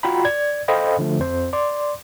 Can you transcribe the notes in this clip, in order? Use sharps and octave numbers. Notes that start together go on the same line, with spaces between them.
F4 F#4 F#5 G5 A#5 B5
D5 G#6
A4 C5 D#5 F5 G5 B5
D3 F3 A3
F2 C4 C5
D5 C6 D6